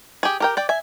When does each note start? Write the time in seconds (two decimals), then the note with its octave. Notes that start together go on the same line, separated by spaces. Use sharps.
0.23 G4 G#4
0.40 G4 A#4 G5
0.57 D5 G5
0.69 E5 G#5